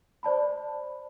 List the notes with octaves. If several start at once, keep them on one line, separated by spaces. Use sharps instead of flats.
C5 D5 A5 B5